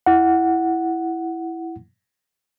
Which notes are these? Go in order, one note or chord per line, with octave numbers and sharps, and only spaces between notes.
E4 F#5